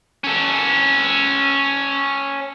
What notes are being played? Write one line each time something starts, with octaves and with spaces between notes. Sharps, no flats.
C#4 A4